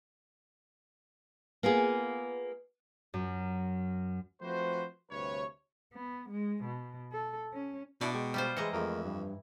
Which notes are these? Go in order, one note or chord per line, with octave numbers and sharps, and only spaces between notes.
A#3 B3 F4 G#4
F#2
F3 A3 C4 F#4 B4 C5
D2 G2 C3 B4 C#5
B3
G#3
B2
A4
C#4
B2 D4 E4 D5 D6
G#3 G5 C#6
G3 F4 C5
E3 G#3 D#5 A#5 C#7
F2 G#3 A3 A#4
G2